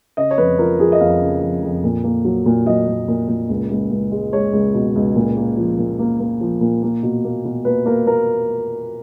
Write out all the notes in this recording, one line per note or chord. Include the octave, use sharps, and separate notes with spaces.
C#3 D#5
C#5
F2 B4
F3 A#4
F3 G#4
D#5
F2 F5
C#3
F2
F2
A#2
A#3
F#3
A#2
F#3 D#5
A#2
A#2
A#2
C#2
C#2
C#2
G#3
G#3 C#5
C#2
B2
C#2
A#2
A#3
F3
A#2
A#3
A#3
F3
A#2
A#3
B2
A#3
B2
A#3 B4
A#3 A#4
A#3 A#4